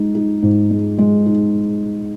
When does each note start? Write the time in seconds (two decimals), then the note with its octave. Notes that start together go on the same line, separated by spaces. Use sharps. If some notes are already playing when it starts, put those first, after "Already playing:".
Already playing: G#3 D#4
0.15 D#4
0.43 G#2
0.71 G#3
0.98 G#3
1.26 D#4